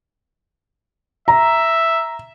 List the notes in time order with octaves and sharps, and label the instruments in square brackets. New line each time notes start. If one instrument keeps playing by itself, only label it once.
[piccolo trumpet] E5 [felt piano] A#5